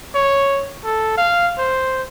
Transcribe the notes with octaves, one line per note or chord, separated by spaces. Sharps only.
C#5
A4
F5
C5